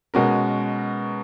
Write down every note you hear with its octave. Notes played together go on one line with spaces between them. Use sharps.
B2 G#3 C#4 F#4 A#4